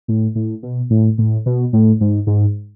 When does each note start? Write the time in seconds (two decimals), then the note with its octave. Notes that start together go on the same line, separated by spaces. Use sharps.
0.08 A2
0.35 A2
0.63 B2
0.90 A2
1.18 A2
1.46 B2
1.73 A2
2.01 G#2
2.27 G#2